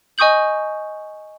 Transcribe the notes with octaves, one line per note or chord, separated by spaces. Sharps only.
D#5 G#5 C#6 D#6 G6 F#7